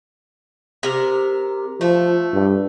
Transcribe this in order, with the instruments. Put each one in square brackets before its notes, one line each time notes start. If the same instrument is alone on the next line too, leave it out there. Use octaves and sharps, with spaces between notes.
[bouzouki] C3 A#4
[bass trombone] F3 [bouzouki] A3
[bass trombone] G2